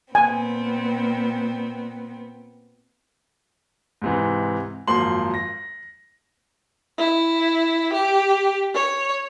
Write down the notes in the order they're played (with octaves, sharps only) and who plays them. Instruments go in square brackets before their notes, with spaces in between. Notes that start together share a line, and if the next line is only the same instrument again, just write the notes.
[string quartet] A#2 B3 C4 [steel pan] G#5
[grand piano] G#2 C3 E3
G#1 F#2 F3 A#3 C6 F#7
A#6
[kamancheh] E4
G4
C#5